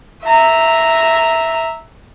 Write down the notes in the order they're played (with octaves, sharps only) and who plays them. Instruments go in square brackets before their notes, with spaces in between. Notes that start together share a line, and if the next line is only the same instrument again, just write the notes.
[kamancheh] E5 A#5